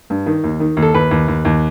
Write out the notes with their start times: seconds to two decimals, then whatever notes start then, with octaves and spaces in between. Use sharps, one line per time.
0.10 G2
0.26 D#3
0.44 D#2
0.60 D#3
0.77 D#2
0.83 A4
0.94 D#2 B4
1.11 D#2
1.28 D#2
1.45 D#2